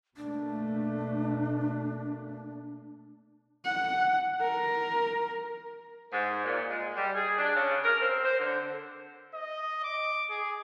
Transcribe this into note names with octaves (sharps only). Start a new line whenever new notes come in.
B2 A3 A#3 D4
F#5
A#4
G#2
A#2
G#3
G3
G#4
D4
C#3
A#4
C4
C5
D3
D#5
D6
G#4